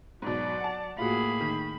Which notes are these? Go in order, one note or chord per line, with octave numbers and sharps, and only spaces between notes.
G#2 B2 F#3 D5
F#5 A5
A2 A#3 F4 F#4 G#4 B5
D#3